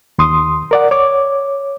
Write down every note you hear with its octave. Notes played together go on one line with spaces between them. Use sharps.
D#2 C6 D#6
A#4 D5 F#5
C#5 D6